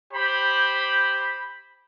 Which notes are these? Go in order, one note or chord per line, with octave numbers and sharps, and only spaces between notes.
G4 C5 B5